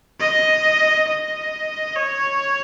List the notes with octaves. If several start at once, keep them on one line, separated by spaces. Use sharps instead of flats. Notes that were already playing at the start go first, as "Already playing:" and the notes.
D#5
D#5
C#5